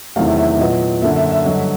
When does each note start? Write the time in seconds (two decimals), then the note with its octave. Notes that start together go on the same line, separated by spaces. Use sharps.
0.16 E2 C3 D#3 F#3 A3 F5
0.27 E5
0.38 E5
0.48 E5
0.58 A#2 F#3 B3 D#5
1.02 F#2 D3 F#3 A#3 E5
1.16 E5
1.31 E5
1.45 G2 D3 F#3 D#5